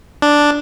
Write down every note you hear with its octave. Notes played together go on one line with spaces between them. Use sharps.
D4